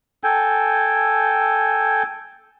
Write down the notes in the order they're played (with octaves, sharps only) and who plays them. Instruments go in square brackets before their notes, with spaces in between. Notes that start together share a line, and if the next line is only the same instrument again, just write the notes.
[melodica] A4 G5 G#5